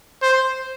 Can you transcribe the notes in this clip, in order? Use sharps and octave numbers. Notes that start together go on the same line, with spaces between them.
C5